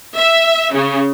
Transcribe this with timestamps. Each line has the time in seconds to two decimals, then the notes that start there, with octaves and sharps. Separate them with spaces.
0.18 E5
0.75 C#3